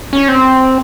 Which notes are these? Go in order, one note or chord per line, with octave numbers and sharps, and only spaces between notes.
C#4
C4